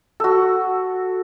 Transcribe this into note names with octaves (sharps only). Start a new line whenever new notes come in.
F#4 A4